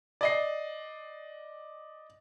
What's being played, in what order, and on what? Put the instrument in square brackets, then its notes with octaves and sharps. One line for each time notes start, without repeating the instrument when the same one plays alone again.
[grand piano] D5 D#5 C7